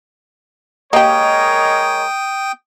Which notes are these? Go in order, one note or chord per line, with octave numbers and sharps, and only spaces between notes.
G#3 A#3 G4 A#4 C#5 D#5 G5 D#6